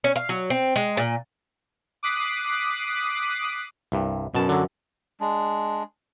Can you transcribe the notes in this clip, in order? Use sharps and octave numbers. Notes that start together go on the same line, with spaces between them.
C#4
F5
F#3
C4
G#3
A#2
D6 D#6 F#6 B6 C7
C2 G2
F#2 B2 A5
D3 F#3
G#3 D4